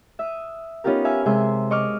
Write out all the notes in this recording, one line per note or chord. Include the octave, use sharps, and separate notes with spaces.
E5 D#6 F6
B3 C#4 D#4 F4 G4 A#4
E5 F5 G#5 F6
C3 G#3 G#4 E5 C6
D#5 C#6 D6 F6